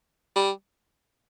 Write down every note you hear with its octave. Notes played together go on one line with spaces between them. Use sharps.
G3